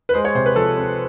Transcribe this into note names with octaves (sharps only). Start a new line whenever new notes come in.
B4
G#3 C5
C#5
C3 C5
B4
F3 A4
C4